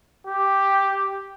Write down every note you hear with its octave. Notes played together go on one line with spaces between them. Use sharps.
G4